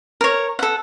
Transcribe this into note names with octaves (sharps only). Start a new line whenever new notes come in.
A#4 C#5
A4 F#5